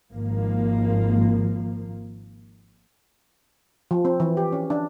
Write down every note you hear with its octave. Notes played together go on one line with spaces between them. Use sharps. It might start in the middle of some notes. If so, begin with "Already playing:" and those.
G#1 F3 A#3
F3
C4
E3
G4
C#4
D4